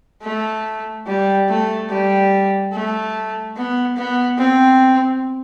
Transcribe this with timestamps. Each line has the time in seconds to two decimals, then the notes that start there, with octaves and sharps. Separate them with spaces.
0.22 A3
1.07 G3
1.48 A3
1.89 G3
2.73 A3
3.56 B3
3.97 B3
4.38 C4